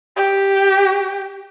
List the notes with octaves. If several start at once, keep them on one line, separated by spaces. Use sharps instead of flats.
G4